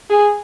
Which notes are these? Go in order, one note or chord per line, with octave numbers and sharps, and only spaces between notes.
G#4